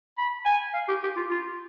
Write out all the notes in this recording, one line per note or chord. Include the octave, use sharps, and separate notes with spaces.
B5
G#5
F5
G4
G4
F4
F4